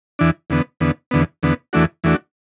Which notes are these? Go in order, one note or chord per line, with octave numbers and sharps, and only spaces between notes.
E2 E3 D4
E2 D3 B3
E2 D3 B3
E2 D3 B3
E2 D3 B3
E2 E3 A3 D4 F#4
E2 E3 A3 D4 F#4